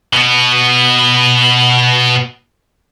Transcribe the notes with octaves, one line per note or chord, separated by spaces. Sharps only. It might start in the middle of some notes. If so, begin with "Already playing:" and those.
B2 B3